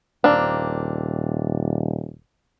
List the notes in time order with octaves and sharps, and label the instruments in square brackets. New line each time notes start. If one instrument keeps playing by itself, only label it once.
[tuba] D#1 [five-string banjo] A#3 C4 D4